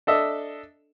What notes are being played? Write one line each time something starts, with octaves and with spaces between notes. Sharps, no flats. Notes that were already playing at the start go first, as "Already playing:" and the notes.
D4 A4 D#5 E5